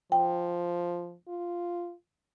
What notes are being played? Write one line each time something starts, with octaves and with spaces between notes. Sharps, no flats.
F3 G5
F4